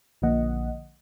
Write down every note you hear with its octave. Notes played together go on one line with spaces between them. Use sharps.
A#1 D3 F3 A#3 D#5 F#5